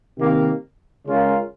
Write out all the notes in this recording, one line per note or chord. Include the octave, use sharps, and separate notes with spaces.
C3 D#3 A#3
C#3 G#3 C#4 F4 A#4